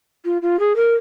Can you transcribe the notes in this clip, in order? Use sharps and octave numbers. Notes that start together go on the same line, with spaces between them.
F4
F4
G#4
A#4